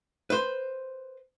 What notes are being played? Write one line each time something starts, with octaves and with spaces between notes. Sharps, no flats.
B4 C5